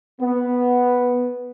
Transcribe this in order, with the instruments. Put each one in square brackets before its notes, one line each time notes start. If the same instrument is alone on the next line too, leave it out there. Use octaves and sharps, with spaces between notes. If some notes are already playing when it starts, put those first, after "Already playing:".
[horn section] B3